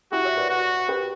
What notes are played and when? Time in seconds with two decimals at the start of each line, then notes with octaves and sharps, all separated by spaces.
0.12 E4 F#4 G4
0.25 C#5 E5
0.37 B4 D5
0.50 F#4
0.88 G4 B4